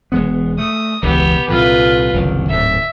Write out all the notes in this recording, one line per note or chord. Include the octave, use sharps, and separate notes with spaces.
E1 G#3 B3
A3 D#6
E1 C#2 E3 B3 G4
C2 A#2 D3 F4 B4
F#1 C2 D#3
D1 G#2 E5